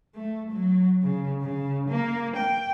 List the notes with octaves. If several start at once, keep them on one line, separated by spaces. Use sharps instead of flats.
A3
F#3
C#3
C#3
A#3
G5